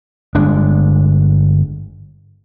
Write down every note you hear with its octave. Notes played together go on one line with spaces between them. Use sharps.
G1 G#3 D4